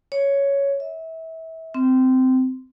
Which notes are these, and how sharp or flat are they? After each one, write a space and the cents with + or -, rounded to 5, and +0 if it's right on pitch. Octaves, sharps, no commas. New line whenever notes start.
C#5 +5
E5 -30
C4 -15